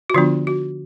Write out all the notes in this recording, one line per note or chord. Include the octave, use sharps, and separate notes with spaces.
F#4
D3 F3 B3 D4 F4
F#4